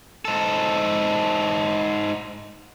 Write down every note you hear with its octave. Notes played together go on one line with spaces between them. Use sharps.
G#2 A4